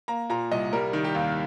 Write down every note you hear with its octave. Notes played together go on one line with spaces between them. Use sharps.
A#3 A#5
A#2 A#5
C2 D#5
G3 A#4
D#3
G4
D#2